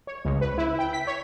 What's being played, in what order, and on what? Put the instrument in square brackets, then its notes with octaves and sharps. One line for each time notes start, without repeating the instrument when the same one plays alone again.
[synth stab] C#5
C#2
B4
E4
G5
B6
C#5